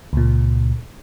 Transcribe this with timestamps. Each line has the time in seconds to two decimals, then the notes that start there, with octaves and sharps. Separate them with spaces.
0.13 C#2 A#2